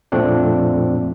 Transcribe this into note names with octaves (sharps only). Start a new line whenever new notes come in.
F2 A#2 A3 C4 D4